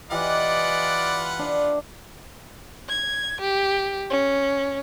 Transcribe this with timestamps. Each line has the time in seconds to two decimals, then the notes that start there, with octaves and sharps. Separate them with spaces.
0.11 E3 F4 G4 B4 D5 D#5 F#5
1.39 D4
2.89 G#6
3.41 G4
4.10 C#4